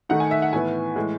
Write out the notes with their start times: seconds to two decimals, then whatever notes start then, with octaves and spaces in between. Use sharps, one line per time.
0.09 D#3 A3 D#4 F#5
0.20 G#5
0.31 E5
0.42 F#5
0.53 A2 E3 B3 E4 G#5
0.96 A2 E3 G#3